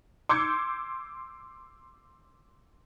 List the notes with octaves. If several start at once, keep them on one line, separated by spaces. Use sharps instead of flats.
C6 D6 E6 G6 G#6 C#7